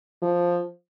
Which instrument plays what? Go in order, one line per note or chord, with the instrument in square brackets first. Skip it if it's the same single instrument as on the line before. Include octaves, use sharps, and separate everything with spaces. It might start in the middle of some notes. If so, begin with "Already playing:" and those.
[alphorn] F3